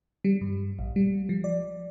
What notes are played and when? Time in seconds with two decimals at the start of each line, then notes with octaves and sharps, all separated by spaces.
0.24 G3
0.41 G2
0.79 A#1
0.96 G3
1.29 F3
1.44 D5